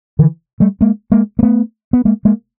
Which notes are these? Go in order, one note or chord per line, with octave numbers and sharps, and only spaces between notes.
D3 E3
G3 A3
G#3 A#3
G#3 A#3
A#3
A3 B3
B3
G#3 A#3
G#3 A#3